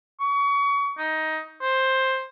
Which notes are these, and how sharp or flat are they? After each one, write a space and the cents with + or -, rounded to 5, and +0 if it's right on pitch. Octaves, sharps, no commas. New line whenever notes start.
C#6 +30
D#4 +15
C5 +10